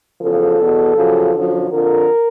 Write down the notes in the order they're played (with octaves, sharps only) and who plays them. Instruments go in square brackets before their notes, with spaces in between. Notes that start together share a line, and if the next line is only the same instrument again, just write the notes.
[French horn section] E2 C#3 F3 A4
E2 B2
F#2 C#3 F3
F#2 D3 F3
F2 D3 F3 A#4